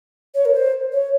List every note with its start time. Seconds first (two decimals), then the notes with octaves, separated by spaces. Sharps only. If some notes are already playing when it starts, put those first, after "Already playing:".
0.34 C#5
0.45 A#4
0.54 C5
0.92 C#5